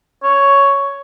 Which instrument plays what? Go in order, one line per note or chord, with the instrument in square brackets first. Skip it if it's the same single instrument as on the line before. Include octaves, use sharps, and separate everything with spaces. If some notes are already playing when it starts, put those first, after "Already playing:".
[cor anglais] C#5